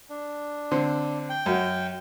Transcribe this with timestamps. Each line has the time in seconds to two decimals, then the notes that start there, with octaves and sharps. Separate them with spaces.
0.09 D4
0.71 D3 C4 C5
1.29 G5
1.46 F#2 F#4